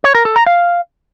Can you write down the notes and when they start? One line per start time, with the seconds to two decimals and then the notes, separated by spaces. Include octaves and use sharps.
0.04 C#5
0.15 A#4
0.25 A4
0.36 A#5
0.47 F5